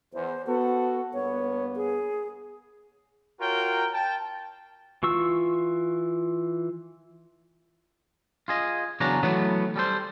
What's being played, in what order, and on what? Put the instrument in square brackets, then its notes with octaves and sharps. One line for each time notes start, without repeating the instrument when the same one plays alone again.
[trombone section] E2 [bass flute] C5
[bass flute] B3 [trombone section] F#4 A4
[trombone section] G2 A#3 B3 [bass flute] C#5
[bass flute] G#4
[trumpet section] F4 F#4 A#4 C#5 G5
G5 A5
[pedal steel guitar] E3 F4 C#6 E6
[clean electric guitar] F4 G#4 D#5
E2 C#3 F#3 C#4 D4 A#5
E3 F#3 A3 B3
G3 A4 C5